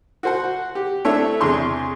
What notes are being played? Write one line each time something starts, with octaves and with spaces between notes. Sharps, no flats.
F#4 C5 F#5
G4
A3 C4 D4 E4 C#5 E5
E2 C3 D4 G#4 C6 C#6